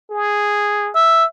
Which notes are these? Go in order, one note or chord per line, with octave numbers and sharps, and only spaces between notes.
G#4
E5